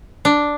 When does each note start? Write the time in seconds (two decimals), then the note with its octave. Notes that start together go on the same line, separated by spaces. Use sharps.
0.25 D4